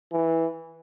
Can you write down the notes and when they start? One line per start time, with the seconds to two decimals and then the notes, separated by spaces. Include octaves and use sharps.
0.12 E3